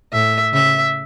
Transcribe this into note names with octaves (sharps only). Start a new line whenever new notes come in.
A2 E5
C#3 E5